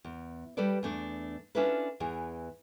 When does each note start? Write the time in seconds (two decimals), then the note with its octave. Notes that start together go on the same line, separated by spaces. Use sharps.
0.05 E2
0.57 G3 G4 A4 B4 D5
0.83 E2 A3 D4
1.55 C#4 D4 E4 F4 A4 B4
2.00 E2 E3 G#4